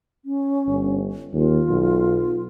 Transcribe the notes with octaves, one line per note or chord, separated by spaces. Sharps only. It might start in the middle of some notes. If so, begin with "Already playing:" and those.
C#4
G1
D#2 F4
B1